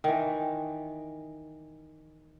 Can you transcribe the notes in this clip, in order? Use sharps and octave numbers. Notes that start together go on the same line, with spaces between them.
D#3 E3